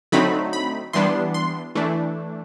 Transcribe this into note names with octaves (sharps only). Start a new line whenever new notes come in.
D3 F#3 A3 C4 D#4 B5
B5
E3 G3 B3 D4 C6
C6
E3 A3 D4